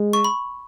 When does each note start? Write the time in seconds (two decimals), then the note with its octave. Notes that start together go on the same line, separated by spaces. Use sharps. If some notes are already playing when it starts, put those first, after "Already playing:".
Already playing: G#3
0.13 C#6
0.24 B5